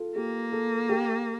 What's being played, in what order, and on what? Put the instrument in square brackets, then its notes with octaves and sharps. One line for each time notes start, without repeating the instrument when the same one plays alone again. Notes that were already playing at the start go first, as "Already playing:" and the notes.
Already playing: [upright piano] F4 A4
[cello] A#3 [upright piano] G4
[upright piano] A4
G4